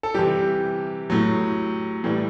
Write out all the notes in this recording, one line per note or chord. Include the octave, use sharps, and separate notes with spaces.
A4
C3 E3 G3 G4
A2 F#3
A2 E3 G3